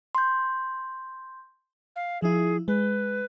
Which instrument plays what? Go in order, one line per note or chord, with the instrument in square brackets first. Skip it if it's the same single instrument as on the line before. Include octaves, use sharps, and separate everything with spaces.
[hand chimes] C6 G6
[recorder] F5
[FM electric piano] F3 E4 [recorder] G#4
[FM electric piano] G#3 [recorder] B4